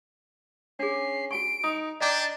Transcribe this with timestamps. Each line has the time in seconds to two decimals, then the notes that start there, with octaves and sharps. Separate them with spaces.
0.79 C#4 D4 G#4 C7
1.31 F#4 G#5 C#6 D7
1.64 D#4 D#6
2.01 D4 D5 D#5 G5 A#5 D6